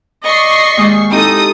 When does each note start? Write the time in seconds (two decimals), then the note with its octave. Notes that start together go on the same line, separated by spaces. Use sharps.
0.23 D5 D#5 C#6 C7
0.77 D#2 G#3 D#6
1.11 C4 D#4 E4 G4 A4 D#6